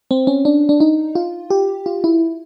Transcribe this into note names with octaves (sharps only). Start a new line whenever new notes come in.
C4
C#4
D4
D4
D#4
F4
G4
F4
E4